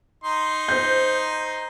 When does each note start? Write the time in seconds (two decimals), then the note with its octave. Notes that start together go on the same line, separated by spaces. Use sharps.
0.24 D#4 C6
0.69 C5 G6